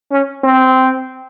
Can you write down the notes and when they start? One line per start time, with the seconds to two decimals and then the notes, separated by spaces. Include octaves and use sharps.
0.12 C#4
0.44 C4